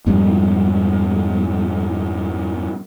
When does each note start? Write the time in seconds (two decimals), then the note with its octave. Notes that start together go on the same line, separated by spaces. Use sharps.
0.06 F2 G#2 F3 G3